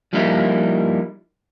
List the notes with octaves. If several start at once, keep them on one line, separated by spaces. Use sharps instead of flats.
F3 G3 A#3 D#4 E4